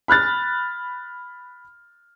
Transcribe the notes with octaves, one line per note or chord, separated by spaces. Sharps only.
B5 F6 F#6 A6